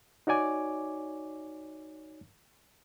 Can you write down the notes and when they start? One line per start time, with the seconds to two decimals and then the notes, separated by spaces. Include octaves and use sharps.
0.27 D#4 F#4 C#5 D5 G#5 D6